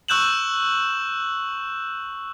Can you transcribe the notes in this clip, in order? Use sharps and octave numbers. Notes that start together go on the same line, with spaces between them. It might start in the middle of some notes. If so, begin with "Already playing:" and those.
C#6 E6 F#6 G6 E7 F#7